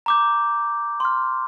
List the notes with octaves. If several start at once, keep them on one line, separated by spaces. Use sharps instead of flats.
A#5 D6 G6
C6 F6